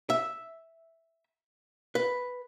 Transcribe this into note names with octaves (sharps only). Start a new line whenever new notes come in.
E5
B4